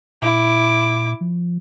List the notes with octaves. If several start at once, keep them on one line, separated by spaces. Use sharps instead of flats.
A#2 E4 D6
F3